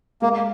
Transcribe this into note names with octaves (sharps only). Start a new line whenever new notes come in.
G#3 A#3